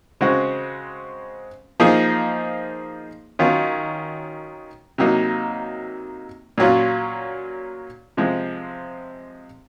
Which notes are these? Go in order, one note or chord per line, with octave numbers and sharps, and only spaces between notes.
C#3 G#3 C4 F#4
F3 A#3 D#4 G#4
D#3 F#3 C#4 F4
C3 F#3 A#3 D#4
A#2 F#3 C#4 F4
C3 F3 G#3